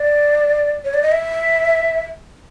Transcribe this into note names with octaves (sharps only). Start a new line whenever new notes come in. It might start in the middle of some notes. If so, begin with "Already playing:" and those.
Already playing: D5
C#5
D5
D#5
E5